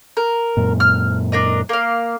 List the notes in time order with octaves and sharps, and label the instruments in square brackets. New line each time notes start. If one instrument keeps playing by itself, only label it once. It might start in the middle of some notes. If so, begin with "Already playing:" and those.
[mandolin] A#4
[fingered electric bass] F#2 A#2
[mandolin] F6
D4 A#4 D#5
A#3 F5